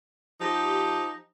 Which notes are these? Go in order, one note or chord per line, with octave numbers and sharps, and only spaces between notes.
F3 D#4 G4